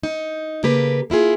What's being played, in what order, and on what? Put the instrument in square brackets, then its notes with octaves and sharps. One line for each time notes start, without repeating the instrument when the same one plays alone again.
[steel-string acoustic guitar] D#4
C#3 A#3 G4 A4 B4
A#3 E4 F4 G#4